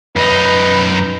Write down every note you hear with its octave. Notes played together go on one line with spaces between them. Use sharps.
F#2 D#4 B4